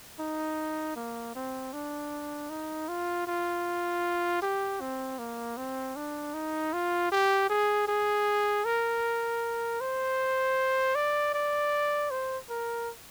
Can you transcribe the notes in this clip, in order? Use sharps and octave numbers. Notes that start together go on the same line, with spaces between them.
D#4
A#3
C4
D4
D#4
F4
F4
G4
C4
A#3
C4
D4
D#4
F4
G4
G#4
G#4
A#4
C5
D5
D5
C5
A#4